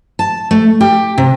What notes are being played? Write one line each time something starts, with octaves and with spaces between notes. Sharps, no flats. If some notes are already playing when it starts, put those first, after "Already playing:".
A5
A3
G4
C3